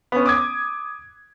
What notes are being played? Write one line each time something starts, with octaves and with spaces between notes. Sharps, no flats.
B3 C#4
D6 D#6 G#6